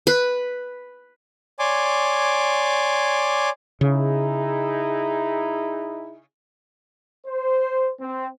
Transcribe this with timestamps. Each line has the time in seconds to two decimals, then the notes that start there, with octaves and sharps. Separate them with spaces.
0.07 B4
1.59 C#5 D5 G#5 C6 D6
3.81 C#3 D#4 E4 G#4
7.26 C5
7.98 C4